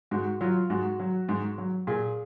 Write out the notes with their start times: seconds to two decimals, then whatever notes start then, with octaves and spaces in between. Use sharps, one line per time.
0.11 G#2 F#4
0.41 F#3 F4
0.70 G#2 F#4
1.00 F#3
1.29 G#2
1.58 F#3
1.87 A#2 G#4